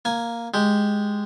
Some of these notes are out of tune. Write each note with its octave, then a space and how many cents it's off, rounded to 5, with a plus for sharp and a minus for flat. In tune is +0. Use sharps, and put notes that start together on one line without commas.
A#3 +0 G#5 +0
G#3 +0 G4 +0